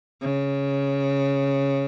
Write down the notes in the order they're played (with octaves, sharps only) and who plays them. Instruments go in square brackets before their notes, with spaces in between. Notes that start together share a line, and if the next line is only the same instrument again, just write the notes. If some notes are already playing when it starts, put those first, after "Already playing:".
[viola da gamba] C#3